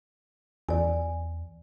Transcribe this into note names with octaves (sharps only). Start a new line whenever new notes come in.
E2 D5 G#5